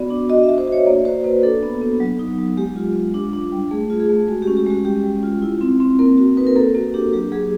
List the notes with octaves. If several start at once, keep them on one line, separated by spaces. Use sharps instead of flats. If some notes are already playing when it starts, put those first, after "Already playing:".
Already playing: B3 F#4 D5
D4
F#4 D#5
E5
F#4
C5
F#4
C#5
A#3 D5
F#4 C5
A#3 B4
D4 A4
B3
B3
F#3
D#4
F#3
G#3 G4
F4
F4
D4
D4
G3
A3 G#4
F4
G#4
A3
G#3 F#4
G4
C#4
G4
G#3 F#4
G3 G4
G3
F4
E4
C4
C4
A#3 A#4
F#4
D#4 B4
A#4
A#3 A4
A#3 F#4
D4 G4
F#3 G4
F#3 G#4